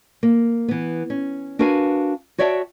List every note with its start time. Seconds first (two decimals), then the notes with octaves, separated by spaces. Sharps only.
0.23 A#3
0.68 E3 B3
1.10 C#4
1.59 D4 F#4 A#4 B4 F5 G#5
2.38 F#4 C#5 D5 E5 G5 A5